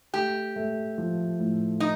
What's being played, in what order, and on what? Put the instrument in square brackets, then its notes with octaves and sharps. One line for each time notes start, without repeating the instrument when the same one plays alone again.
[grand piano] A3 [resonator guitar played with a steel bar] G4
[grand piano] A3
F3
A2
[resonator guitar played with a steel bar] D#4